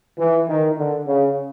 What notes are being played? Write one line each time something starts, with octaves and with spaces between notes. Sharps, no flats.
E3
D#3
D3
C#3